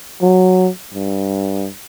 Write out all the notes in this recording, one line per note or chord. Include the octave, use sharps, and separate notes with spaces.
F#3
G2